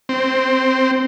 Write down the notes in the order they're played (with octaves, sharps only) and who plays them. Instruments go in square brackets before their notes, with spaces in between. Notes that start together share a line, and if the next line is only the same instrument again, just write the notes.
[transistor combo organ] C4